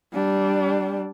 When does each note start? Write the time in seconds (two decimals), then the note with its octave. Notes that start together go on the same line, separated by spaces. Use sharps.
0.13 G3 D4